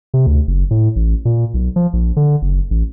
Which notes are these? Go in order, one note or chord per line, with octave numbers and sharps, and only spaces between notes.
C3
D2
F#1
A2
A1
A#2
B1
F3
A#1
D3
F#1
A1